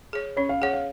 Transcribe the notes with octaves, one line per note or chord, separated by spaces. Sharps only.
G#4 C#5
C#4 C#5
F5
G#4 C#5 F#5
F5